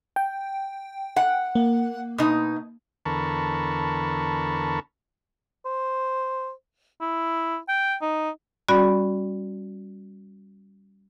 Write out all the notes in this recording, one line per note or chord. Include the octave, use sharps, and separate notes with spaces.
G5
F#5
A#3
B2 D#4
E2 D3 A#4 A5 B5 C#6
C5
E4
G5
D#4
G3 C#4 F#4 D5 B5